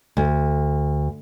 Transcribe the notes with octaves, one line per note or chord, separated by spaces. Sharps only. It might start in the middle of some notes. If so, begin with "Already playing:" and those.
D2